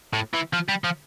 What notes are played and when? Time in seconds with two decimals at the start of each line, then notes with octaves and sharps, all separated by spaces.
0.13 A2
0.34 E3
0.53 F3
0.69 G3
0.84 F3